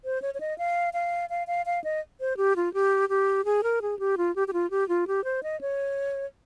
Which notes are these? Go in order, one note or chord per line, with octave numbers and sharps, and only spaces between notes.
C5
C#5
C#5
D#5
F5
F5
F5
F5
F5
D#5
C5
G4
F4
G4
G4
G#4
A#4
G#4
G4
F4
G4
G4
F4
G4
F4
G4
C5
D#5
C#5